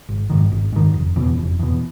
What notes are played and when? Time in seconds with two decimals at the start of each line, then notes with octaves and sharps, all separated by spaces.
0.09 G#1
0.30 G#2 D#3
0.52 G#1
0.73 G#2 D#3
0.94 F1
1.16 E2 B2
1.38 F1
1.59 E2 B2